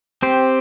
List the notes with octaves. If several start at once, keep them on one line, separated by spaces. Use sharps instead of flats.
C4 G4 C5